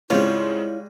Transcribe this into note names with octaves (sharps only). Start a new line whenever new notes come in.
G#2 C#3 G3 G#3 C4 E4 F4 C#5